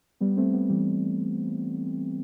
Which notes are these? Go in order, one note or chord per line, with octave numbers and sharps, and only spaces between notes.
G3 B3
A3 C4
G3 B3
E3 G3